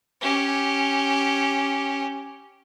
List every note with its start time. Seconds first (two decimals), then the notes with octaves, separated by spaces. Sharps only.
0.21 C#4 G4